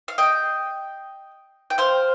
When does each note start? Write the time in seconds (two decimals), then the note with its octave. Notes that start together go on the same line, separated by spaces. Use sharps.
0.08 F5
0.18 D#5 G5
1.70 G5
1.78 C5 F5